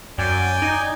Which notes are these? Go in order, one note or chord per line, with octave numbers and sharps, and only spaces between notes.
F#2 D5 G5 G#5
D#4